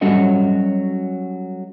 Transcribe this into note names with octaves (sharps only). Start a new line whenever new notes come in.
F#3 G3 C#4 F#4 A4 D#5